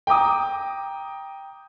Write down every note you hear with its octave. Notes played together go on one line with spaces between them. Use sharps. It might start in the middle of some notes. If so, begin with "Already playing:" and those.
G5 A#5 D6 D#6